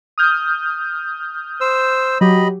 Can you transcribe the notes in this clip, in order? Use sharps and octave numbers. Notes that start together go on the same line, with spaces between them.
D#6 F6 G6
C5 E6
F#3 G4 D#5 B5